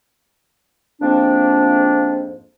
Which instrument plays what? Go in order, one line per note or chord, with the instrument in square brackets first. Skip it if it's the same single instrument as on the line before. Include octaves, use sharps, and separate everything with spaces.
[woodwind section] F2 G#2 F3 A#3 C4 D4